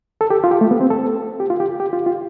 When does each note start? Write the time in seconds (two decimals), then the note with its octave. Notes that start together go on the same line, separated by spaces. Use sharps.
0.21 A4
0.30 G4
0.44 F4
0.51 G4
0.61 A3
0.71 B3
0.81 C4
0.90 A4
1.40 G4
1.50 F4
1.60 G4
1.80 G4
1.93 F4
2.06 F4